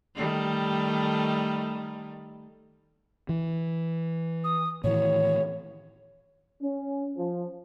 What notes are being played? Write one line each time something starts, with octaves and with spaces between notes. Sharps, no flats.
D#3 G3 A3
E3
D#6
A2 D#3 E3 C#5
C#4
F3